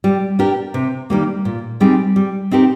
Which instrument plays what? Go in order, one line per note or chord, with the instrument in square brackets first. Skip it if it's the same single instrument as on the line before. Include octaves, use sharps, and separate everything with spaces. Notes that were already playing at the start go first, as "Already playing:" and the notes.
[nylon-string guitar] G3
D4 G4 A#4
C3
D#3 G3 A#3
A#2
G3 C4 D#4 G#4
G3
C4 D#4 G4 A#4